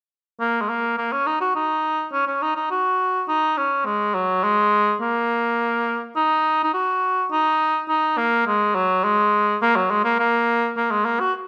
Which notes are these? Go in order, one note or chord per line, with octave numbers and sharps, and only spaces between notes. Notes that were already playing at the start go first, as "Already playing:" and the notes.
A#3
G#3
A#3
A#3
C#4
D#4
F#4
D#4
C#4
C#4
D#4
D#4
F#4
D#4
C#4
G#3
F#3
G#3
A#3
D#4
D#4
F#4
D#4
D#4
A#3
G#3
F#3
G#3
A#3
F#3
G#3
A#3
A#3
A#3
G#3
A#3
F#4